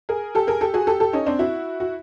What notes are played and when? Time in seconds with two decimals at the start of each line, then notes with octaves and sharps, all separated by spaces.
0.09 G#4 A#4
0.35 G4 A4
0.47 G#4 A#4
0.61 G4 A4
0.74 F#4 G#4
0.87 G4 A4
1.00 G4 A4
1.13 C#4 D#4
1.26 C4 D4
1.39 E4 F#4
1.80 F#4